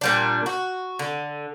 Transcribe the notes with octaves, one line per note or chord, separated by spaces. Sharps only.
A#2 G3 D4
F#4
D3